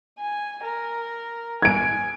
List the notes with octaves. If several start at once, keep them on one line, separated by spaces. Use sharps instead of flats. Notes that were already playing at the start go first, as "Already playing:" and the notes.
G#5
A#4
G#5 G#6 D7